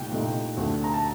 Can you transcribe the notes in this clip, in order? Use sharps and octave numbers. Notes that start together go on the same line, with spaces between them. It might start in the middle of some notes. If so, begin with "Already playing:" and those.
Already playing: C2 A#2 A3 D#4 G5
C2 A#2 A3 D#4
D2 D3 A3
A#5
A5